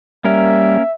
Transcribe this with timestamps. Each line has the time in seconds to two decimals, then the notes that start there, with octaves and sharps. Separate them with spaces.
0.25 G3 A#3 C#4 A#4 E5